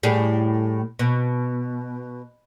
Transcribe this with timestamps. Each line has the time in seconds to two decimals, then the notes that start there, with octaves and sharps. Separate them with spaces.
0.03 A2 G3 G#4
0.99 B2